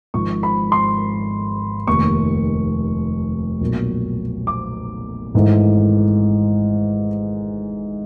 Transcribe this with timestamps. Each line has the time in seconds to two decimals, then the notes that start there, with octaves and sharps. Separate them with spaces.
0.14 G#1 G#2 F3 C#6
0.43 B5
0.72 C6
1.87 F1 D#2 D#3 C#6
3.61 B1 A#2 F#3
4.47 D6
5.34 G#1 G#2 E3 A3